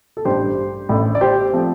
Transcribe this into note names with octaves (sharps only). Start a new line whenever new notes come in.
A4
A1 G2 G3 D4 G4 C5
A1 A2 A3 D4
D5
G4 C5
F3 A3 C4